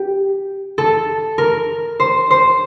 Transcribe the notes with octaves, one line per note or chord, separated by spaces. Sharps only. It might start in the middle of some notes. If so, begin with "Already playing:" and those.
Already playing: G4
A4
A#4
C5
C5